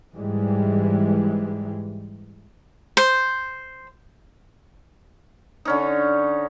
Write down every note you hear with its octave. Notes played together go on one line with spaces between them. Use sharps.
G#2 E3 G3 G#3
C5
D3 C#4 D#4